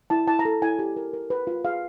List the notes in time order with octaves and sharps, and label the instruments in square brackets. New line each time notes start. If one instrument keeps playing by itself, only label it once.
[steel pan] E4 A5
E4 A5
A#5
A4
E4 G#5
G4
A#4
A#4
B4
F4
G#4 F5